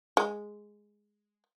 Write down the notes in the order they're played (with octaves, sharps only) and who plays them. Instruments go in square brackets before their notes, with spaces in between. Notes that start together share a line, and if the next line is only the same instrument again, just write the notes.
[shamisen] G#3